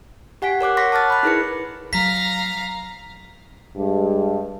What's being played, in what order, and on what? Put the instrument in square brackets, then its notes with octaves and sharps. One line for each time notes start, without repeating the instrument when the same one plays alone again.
[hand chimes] G4 F#5 G#5 B6 D7
A#4 C#5 D6 F#6
F#5 C6 C#6 A#6 B6
A5 D6 F6 F#6 A6
B5 F#6
D#4 E4 G#4 A#4 B4 C#7
[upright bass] F#3 [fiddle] F5 A#5 [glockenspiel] B6
[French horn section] G2 G#3